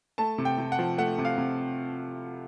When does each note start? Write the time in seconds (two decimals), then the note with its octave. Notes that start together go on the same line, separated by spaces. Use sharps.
0.18 A3 A5
0.38 C3
0.45 G5
0.58 C3
0.72 F#5
0.79 F3
0.98 A3 F#5
1.18 C3
1.25 F5
1.38 C3